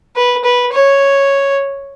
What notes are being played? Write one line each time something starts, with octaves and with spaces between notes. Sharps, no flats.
B4
B4
C#5